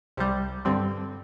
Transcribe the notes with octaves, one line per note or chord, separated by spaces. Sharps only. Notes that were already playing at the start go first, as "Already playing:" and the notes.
C2 C3 G3
G2 D3 G3 C4